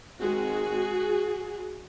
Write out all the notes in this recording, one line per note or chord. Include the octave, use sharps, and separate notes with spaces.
D#3 G#3 C4 F#4 G#4